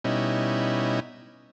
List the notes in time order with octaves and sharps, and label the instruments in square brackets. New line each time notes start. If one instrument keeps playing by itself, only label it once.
[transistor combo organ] B2 G3 C#4 D#4 E4